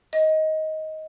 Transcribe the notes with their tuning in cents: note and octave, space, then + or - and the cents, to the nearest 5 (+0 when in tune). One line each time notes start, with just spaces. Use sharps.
D#5 +15